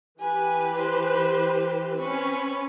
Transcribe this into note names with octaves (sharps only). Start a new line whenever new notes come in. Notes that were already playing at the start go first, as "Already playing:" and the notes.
E3 G4 B4 G#5
C5
C4 C#4 B4 C#6